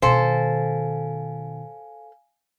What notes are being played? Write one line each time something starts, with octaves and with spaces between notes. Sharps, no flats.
B2 D#3 A4 C5 F5 G#5